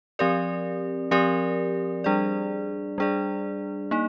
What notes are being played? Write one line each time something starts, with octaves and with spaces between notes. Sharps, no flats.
F3 C4 G4 A#4 D5
F3 C4 G4 A#4 D5
G3 D4 G#4 D5
G3 D4 G#4 D5
A#3 D#4